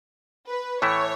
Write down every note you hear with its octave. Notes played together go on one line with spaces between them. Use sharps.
B4
A2 E3 A3 E4 C#5